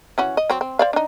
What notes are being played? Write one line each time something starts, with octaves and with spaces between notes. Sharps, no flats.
E3 C#4 F#4
D#5
F#3 C4
C4
C5 D5 F5
D4 D#4